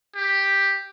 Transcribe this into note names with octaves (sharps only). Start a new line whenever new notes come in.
G4